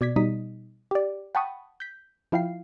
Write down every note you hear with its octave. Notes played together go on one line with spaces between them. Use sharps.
B2 D5 G#6 B6
B2 G3 D#4 D#6 B6
G4 D5
F#5 G5 A5 B5 C#6 D#6
G6 B6
F3 E4 F5 G5 C7